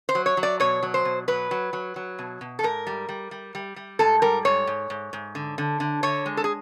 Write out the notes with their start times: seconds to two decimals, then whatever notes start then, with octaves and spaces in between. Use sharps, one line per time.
0.09 C5
0.15 F#3
0.26 C#5
0.37 F#3
0.43 D5
0.60 B2 C#5
0.83 F#3
0.94 C5
1.05 B2
1.28 F#3 B4
1.51 F#3
1.73 F#3
1.96 F#3
2.19 B2
2.41 B2
2.59 A4
2.63 G#2 A#4
2.87 G3
3.09 G3
3.31 G3
3.55 G3
3.76 G3
3.99 G#2 A4
4.22 G3 A#4
4.45 G#2 C#5
4.67 G#2
4.90 G#2
5.13 G#2
5.35 D3
5.58 D3
5.80 D3
6.03 D3 C#5
6.26 G#3
6.37 A4
6.44 G#4